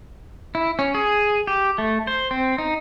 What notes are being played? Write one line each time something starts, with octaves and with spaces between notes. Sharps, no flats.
E4
C#4
G#4
G4
A3
C5
C4
D#4